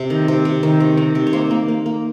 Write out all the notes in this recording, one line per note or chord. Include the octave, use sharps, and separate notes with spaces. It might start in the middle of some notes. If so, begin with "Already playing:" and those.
Already playing: C3
D#3
C3
C3
D#3
C3
D#3
C3
C#5
A#3 C5
A#3
A#3
A#3